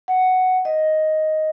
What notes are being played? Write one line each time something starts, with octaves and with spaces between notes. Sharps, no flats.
F#5
D#5